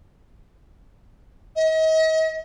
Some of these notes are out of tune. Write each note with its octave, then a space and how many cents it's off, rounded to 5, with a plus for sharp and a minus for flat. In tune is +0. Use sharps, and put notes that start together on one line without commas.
D#5 +40